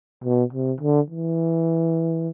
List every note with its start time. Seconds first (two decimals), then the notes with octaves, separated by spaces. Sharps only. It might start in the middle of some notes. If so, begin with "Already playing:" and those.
0.24 B2
0.53 C3
0.81 D3
1.10 E3